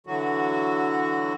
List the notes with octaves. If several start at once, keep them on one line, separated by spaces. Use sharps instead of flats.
D3 E3 F#3 F#4